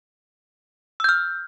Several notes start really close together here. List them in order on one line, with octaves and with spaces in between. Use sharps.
E6 G6 F6